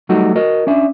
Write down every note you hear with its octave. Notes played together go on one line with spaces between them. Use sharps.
F#3 G3 A3 D#4 F#4
F#4 A#4 D#5
C#4 D4 E5